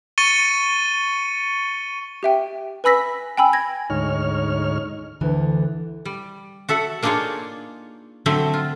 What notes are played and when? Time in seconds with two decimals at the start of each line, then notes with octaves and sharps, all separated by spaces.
0.18 C#6 A6 C#7 D#7 G7
2.23 G4 E5 G5
2.84 B4 G#5 B5 E6 A#6 B6
3.37 G5 G#5 B5 E6
3.53 G#6 A#6
3.90 D2 G#2 D#4 C#5 F6
5.21 D2 D3 E3
6.05 G3
6.69 F#4 A4 E5 F#5
7.03 A#3 D4 D#4 F4 G#4 C#5
8.26 D3 F#3 A3 C4 E5
8.54 F4